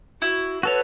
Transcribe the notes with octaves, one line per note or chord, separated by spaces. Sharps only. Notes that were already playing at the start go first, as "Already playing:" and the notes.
E4 F#4
F#4 A4 B4 C#5